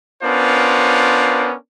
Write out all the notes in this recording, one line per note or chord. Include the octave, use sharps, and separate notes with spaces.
B3 C#4 D4 F4 A#4 C5